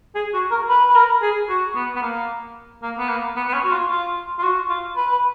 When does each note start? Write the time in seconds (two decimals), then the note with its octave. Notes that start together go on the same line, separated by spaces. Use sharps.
0.15 G#4
0.34 F#4
0.51 A#4
0.69 B4
0.89 B4
0.96 A#4
1.22 G#4
1.49 F#4
1.76 B3
1.96 B3
2.02 A#3
2.82 A#3
2.98 B3
3.09 A#3
3.36 B3
3.48 B3
3.53 C#4
3.65 F#4
3.72 F4
3.89 F4
4.39 F4
4.43 F#4
4.69 F4
4.97 B4
5.12 B4